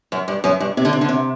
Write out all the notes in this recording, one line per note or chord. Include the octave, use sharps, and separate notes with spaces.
F#2
G2
F#2
G2
C3
D3
C3
D3
C3